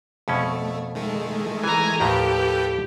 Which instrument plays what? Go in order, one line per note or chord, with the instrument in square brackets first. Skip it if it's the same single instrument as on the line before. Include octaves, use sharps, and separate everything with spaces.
[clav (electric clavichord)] F2 B2 C#4 [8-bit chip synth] A3
[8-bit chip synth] D#3 G#3 A3
[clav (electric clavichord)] E3 [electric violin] G#5 A#5
[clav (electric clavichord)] D#2 A2 F3 [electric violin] G4 [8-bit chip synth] A4 B4 G5